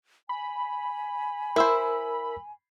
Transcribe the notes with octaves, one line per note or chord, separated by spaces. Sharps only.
G#5 B5
E4 A#4 C5 E6